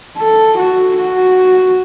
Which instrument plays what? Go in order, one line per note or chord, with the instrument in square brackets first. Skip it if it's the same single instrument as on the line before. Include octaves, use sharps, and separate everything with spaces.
[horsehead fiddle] A4
F#4
F#4